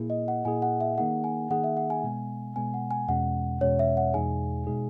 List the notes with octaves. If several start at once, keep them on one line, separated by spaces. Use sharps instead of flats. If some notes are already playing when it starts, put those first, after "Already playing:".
Already playing: A#2 A#3 E4 G#4
D#5
F#5
A#2 A#3 E4 G#4 G#5
F#5
E5
D#3 A#3 D#4 G#4 F#5
G#5
D#3 A#3 D#4 G#4 F#5
E5
F#5
G#5
B2 G#3 B3
B2 G#3 B3 G#5
F#5
G#5
E2 B2 G#3 C#4 F#5
E2 B2 G#3 C#4 C#5
E5
F#5
E2 B2 G#3 D#4 G#4 G#5
B2 G#3 D#4 G#4